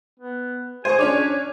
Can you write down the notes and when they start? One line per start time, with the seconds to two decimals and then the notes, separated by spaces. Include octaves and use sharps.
0.20 B3
0.85 G#4 C5 G#5 C#6
0.99 C#4 D4 C#5 D5